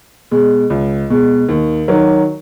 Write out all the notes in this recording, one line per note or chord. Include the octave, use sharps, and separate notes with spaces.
B2 G#3
C#2
B2 G#3
D#2
D#3 F#3